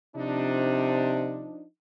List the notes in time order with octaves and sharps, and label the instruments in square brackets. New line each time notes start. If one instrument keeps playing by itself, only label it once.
[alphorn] C3 [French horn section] F3 D4 D#4